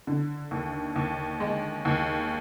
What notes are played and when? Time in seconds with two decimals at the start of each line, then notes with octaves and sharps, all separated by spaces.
0.07 D3
0.51 D#2
0.96 D#2
1.40 G#3
1.85 D#2